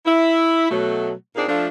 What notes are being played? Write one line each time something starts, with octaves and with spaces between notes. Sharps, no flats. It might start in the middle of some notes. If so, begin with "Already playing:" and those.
E4
B2 F#3 A3
A#2 A#3 C4 D4 D#4 G#4
F3 A3 D4